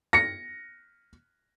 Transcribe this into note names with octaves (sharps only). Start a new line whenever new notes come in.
A#6 C#7